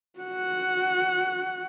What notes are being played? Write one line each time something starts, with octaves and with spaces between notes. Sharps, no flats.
F#4 F#5